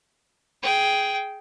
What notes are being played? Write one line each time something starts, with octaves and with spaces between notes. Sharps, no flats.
G#4 G5